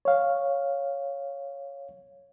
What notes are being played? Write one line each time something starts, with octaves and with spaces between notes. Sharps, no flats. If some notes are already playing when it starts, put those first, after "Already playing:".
C#5 F5